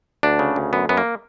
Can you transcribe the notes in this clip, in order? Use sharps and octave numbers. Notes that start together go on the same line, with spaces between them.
D2 D4
C#3
D2
F#2 B3
F#2 B3
A#3